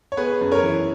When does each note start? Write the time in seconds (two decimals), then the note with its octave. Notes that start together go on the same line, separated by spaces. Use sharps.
0.12 C#5
0.17 B3 G#4 B4
0.41 F#2
0.52 A#4 C#5
0.63 E3